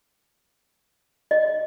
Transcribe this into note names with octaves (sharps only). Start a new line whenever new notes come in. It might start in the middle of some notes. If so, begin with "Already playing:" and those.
D#5